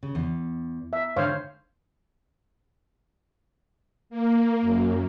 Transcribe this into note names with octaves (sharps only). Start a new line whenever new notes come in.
C#3
E2
E5
G#2 D3 C5 C#5 F5
A#3
F#2